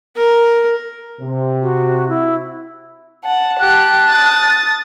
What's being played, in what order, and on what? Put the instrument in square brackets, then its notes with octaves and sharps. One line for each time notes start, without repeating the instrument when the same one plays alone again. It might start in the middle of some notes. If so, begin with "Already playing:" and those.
[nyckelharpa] A#4
[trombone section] C3
[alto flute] F#4
E4
[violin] F#5 [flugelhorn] A5
[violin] G4 [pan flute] F#6
[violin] D#6 A6